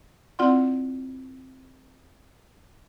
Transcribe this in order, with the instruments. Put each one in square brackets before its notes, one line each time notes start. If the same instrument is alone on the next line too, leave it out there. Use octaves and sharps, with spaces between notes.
[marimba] C4 E4 F4 D5 F#5 C6